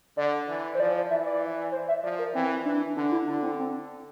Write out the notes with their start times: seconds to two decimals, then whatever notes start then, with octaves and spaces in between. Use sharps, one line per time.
0.17 D3 D5
0.48 E3
0.75 C5
0.79 F3 D5
1.10 E3 E5
1.25 D5
1.72 C5
1.88 E5
2.03 F3 D5
2.19 A#4
2.34 E3 C4
2.65 E3 D4
2.96 D3 D4
3.12 E4
3.27 D3 D4
3.42 C4
3.59 C4